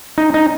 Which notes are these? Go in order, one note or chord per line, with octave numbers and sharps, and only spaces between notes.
D#4
D#4